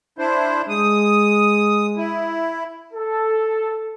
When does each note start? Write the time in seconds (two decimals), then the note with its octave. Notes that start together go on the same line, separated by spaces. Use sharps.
0.19 D4 E4 C5
0.69 G#3 D#6
1.97 E4
2.94 A4